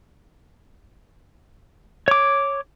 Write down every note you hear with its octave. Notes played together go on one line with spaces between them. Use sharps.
C#5 D6